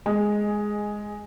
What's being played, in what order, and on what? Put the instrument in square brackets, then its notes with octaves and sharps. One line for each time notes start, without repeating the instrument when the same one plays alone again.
[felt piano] G#3